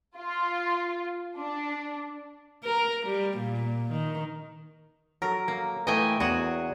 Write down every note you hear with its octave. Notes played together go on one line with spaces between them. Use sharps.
F4
D4
A#4
G3
A#2
D#3
F#3 A4 A#4
A#3
E3 A3 D#5 G5 G#5
E2 F#4 G#4 C#5 F#5